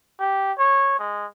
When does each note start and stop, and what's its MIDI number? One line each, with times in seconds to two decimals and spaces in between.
0.19 0.52 67
0.58 0.95 73
0.99 1.26 56